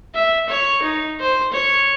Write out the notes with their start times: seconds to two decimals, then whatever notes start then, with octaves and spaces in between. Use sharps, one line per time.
0.14 E5
0.49 C#5
0.82 D#4
1.20 C5
1.52 C#5